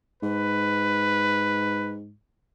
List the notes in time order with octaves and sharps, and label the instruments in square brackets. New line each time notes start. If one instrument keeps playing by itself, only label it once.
[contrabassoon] G#2 [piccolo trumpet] B4